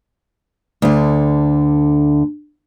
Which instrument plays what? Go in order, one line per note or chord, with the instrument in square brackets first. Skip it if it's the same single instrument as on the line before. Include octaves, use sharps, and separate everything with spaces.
[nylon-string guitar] D2 D3